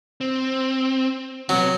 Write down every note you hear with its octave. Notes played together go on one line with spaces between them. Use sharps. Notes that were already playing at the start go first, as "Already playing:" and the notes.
C4
C3 F#3 B3